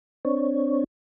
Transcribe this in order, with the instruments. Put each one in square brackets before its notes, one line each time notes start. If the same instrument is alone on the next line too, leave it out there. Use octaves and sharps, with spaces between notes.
[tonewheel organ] C4 D4 C#5